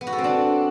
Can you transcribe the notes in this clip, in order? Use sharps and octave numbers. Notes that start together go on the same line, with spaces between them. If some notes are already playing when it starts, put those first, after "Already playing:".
B3
F#4
A4
C4
D4